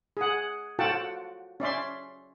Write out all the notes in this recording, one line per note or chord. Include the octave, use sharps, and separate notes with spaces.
G#4 F#5
F4 F#4 A4 F#5 G5 A5
C#4 D5 E5 C6